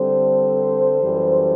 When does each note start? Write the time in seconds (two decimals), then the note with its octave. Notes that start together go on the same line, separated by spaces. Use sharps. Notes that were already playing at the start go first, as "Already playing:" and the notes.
Already playing: D3 G3 C4 A4 C5
1.01 F#2 E3 G3